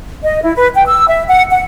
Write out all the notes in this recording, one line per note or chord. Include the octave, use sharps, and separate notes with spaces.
D#5
E4
B4
G5
E6
E5
F#5
F#5